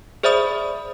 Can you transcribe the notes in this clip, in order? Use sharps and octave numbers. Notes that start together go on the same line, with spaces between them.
G#4 C5 D5 E5 B5 D#6